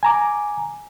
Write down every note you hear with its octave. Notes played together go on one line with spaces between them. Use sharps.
G#5 A#5 D6